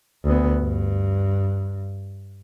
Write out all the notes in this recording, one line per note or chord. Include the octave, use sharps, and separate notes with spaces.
D2 B3
G2